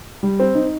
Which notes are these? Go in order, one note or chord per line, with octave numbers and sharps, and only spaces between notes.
G3
C4
D#4